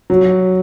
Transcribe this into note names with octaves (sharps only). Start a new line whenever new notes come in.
F#3